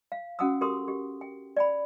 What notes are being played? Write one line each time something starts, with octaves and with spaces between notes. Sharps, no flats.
F5
C#4 F#4 F#5 G5 D#6 E6
G4 A4 A#4 C6 D#6
G4
G5
D5 G5 B5